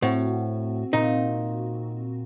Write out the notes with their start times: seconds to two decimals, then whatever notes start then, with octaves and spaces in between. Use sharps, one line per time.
0.02 A2 C4 F#4
0.93 A#2 D#4